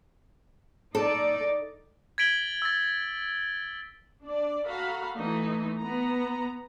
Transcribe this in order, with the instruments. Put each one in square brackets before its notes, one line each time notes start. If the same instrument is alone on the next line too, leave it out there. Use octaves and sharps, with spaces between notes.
[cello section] D#4 D5 [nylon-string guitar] A4
[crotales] G#6 A6 B6 D7 F#7 G7
E6 A6
[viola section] D4 D5
F#4 A4 F5 A#5 B5
E3 A3 D#4
B3 A#5